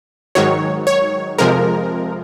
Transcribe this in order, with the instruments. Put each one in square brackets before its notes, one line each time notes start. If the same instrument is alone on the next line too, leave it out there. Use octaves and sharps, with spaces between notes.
[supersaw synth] G#2 D#3 F#3 C#5
C#5
F2 C3 F3 G#3 A#4